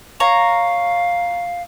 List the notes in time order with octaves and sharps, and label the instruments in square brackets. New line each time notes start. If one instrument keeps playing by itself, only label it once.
[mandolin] C#5 A#5 [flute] F5